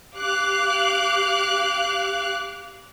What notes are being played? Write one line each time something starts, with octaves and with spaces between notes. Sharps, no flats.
G4 F5 D6 F#6